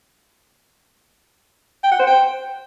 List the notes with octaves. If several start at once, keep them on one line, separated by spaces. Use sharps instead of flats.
G5
F#5
C5
G5